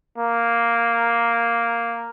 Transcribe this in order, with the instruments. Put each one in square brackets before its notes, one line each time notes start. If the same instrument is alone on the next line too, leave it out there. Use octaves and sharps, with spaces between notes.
[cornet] A#3